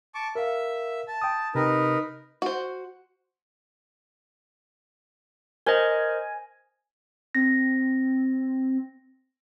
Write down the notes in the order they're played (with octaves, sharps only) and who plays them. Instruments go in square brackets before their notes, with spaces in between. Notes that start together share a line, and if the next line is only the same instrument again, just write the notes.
[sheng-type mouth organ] A5 C#6 D6
[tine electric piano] A#4 F5 [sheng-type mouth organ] E5
[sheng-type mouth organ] A5
[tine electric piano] G5 D#6
[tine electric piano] C3 [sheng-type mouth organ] D#4 A#4 B4
[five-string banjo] F#4 C5
[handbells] A#4 C5 D#5 [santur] G#5
[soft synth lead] C4 [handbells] A#6